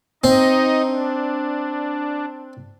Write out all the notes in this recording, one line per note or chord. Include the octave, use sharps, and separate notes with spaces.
C4 D#4 D#5
D4